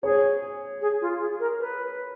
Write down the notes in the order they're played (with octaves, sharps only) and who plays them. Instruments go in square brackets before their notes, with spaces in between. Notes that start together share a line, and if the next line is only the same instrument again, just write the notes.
[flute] G#4 [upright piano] C#5
[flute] G#4
F4
G#4
A#4
B4